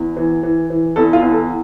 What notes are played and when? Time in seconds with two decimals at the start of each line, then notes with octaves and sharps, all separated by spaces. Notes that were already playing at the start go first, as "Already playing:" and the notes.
Already playing: E2
0.17 E3
0.43 E3
0.70 E3
0.96 E2 A4
1.13 F4
1.22 E2
1.32 A4